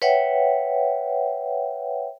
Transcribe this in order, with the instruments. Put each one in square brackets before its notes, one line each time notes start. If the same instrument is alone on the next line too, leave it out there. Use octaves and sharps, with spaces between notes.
[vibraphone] B4 C#5 E5 F#5 G5